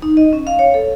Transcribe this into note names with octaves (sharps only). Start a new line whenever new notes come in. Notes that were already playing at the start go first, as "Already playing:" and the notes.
D#4
D#5
C#4
F5
C#5
A4